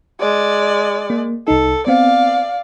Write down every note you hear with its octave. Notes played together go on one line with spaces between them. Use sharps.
G#3 D5
A#3
C2 D#4 A4
B3 C4 D5 F5